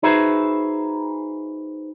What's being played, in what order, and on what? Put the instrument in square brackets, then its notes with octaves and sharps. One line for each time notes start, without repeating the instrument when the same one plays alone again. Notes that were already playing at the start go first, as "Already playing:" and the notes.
[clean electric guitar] D#4 F#4 G#4 B4 C5 E5